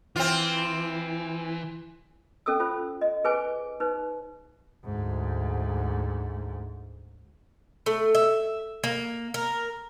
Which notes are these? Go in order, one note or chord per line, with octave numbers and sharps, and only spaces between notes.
E3 C4 F4
C#4 A4 D#6 E6
F4 C5
D#5
G#4 B4 C5 G#5 D6
D#4 B4 C5
D2 G#2
A3
E5
A#3
A#4